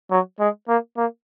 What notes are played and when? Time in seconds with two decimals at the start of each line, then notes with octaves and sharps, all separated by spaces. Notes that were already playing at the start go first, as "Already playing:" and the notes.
0.11 F#3
0.40 G#3
0.68 A#3
0.97 A#3